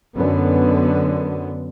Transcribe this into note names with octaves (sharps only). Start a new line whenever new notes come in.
F#2 D3 B3